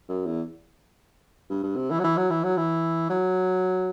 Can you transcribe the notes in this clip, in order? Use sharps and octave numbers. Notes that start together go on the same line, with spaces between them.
F#2
E2
G2
G2
C3
E3
F#3
E3
F#3
E3
F#3
E3
F#3